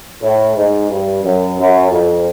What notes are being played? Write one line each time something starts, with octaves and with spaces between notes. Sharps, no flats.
A2
G#2
G2
F#2
F#2
F2